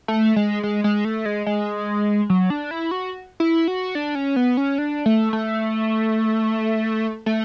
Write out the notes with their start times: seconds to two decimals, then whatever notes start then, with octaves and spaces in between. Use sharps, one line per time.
0.08 A3
0.36 G#3
0.63 G#3
0.84 G#3
1.05 A3
1.25 G#3
1.46 G#3
2.30 F#3
2.50 D4
2.71 E4
2.91 F#4
3.40 E4
3.68 F#4
3.95 D4
4.15 C#4
4.36 B3
4.57 C#4
4.78 D4
5.06 A3
5.33 A3
7.26 A3